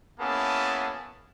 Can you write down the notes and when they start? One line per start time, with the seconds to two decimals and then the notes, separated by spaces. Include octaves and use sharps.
0.20 A#3 B3 C#4 E4 G#4 A5